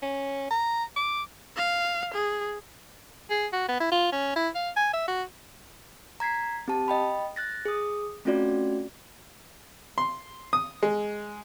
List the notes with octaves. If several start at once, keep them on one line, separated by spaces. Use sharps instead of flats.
C#4
A#5
D6
F5
G#4
G#4
F#4
B3
E4
F4
C#4
E4
F5
G#5
E5
F#4
A#5 G#6 B6 C7
C4 G4 A5
D#5 G5 B5
F#6 A6 A#6
G#4 D#6
A3 C4 C#4 F4 F#4 D5
C6
D#6
G#3